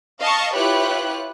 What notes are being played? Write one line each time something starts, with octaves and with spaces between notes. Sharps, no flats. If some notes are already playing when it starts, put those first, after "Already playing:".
D#5 F5 A5 C#6
E4 F4 G4 B4 C#5 F#6